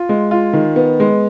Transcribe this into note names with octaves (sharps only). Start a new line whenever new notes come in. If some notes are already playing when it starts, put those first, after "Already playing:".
Already playing: F4
G#3
F4
D#3
B3
G#3